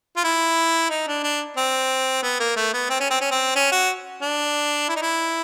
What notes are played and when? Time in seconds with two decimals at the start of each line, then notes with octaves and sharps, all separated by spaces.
0.16 F4
0.24 E4
0.90 D#4
1.08 D4
1.23 D4
1.57 C4
2.23 B3
2.40 A#3
2.56 A3
2.73 B3
2.90 C4
3.00 C#4
3.10 C4
3.21 C#4
3.31 C4
3.56 C#4
3.72 F#4
4.22 D4
4.89 E4
4.96 D#4
5.02 E4